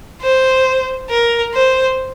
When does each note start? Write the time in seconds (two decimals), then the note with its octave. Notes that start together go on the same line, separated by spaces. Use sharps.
0.22 C5
1.10 A#4
1.54 C5